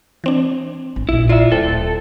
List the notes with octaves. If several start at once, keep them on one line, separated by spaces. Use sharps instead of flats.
E3 C4 D4
G#1
A#1 A#2 E4
E4 F4 D5 E5
D1 A4 C5 G5